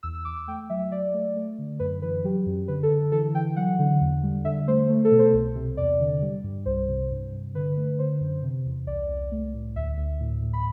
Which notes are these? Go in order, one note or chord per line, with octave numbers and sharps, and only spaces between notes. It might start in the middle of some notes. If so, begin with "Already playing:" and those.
E2 E6
E6
E2 D6
D6
A3 G5
F#3 E5
F#3 D5
A3
A3
D3
F#2 B4
E3 B4
F#3 G4
F#2
D3 B4
A4
D3
E3 A4
E3 G5
F#3 F#5
D3
E2
G3
D3 E5
A3 C5
A3
A4
B2
C5
C2
C3
E2 D5
D3
G3
G2
C2 C5
C3
G2
G2
D3 B4
A3
D3 C5
F#2
C3
E2
C2 D5
C2
A3
A2
D2 E5
D2
A2
A2
B5